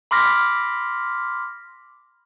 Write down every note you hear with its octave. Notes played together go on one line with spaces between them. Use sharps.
B5 C6 D6 F6 A#6 B6